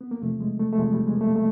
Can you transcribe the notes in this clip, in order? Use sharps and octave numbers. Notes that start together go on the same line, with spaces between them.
B3
A#3
E2 C3 F3 A3
G#3
A3
A3
E2 C3 F3 G#3
G3
G#3
A#3
A3
A3